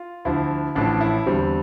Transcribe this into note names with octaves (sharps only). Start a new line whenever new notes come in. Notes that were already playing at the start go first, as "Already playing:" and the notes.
Already playing: F4
D2 D3 F3 E4
A1 A2 F3 D4
E4
E2 D3 G3 C4